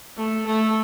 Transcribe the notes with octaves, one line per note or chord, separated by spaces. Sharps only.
A3
A3